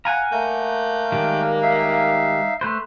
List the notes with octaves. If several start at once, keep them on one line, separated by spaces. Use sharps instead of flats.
F5 F#5 G#5 A#5
A3 A#3 G6
D#3 G3 G#3
D#4 E5 F5
A3 B4 C5